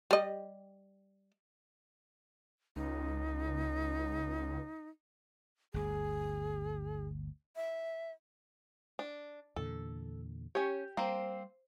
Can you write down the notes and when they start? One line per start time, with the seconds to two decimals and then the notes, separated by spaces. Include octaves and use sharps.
0.11 G3 D#5
2.76 C#2 D#4
5.74 G1 D2 G#4
7.56 E5
8.99 D4
9.56 E2 A#2 D3 A4
10.55 C#4 G4 C#5
10.97 G3 A#3 C4 C5